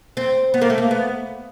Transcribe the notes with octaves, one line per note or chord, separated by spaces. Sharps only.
C4
B3
A#3
A3
A#3
B3